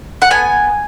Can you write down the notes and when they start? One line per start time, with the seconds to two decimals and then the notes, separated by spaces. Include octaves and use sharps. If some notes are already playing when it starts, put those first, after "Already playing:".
0.22 F#5
0.30 B3 G#5